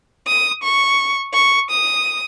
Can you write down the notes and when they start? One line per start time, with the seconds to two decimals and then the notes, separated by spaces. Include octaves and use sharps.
0.27 D#6
0.63 C#6
1.34 C#6
1.70 D#6